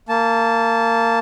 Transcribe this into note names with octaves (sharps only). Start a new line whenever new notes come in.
A#3 A5